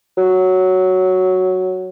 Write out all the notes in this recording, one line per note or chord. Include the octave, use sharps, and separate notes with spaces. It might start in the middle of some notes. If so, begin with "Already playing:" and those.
F#3